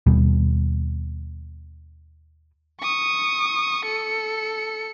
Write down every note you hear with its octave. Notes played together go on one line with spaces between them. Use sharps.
D#2 B2 G3
C#6 D#6
A4 C#7